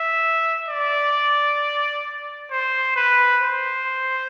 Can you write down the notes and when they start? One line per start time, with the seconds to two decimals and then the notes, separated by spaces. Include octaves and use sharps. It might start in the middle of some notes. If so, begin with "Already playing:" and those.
Already playing: E5
0.69 D5
2.51 C5
2.96 B4
3.42 C5